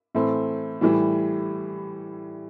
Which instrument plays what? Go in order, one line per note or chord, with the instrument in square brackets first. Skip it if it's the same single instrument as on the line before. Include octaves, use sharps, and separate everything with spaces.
[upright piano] A2 E3 A3 C4
A2 E3 G3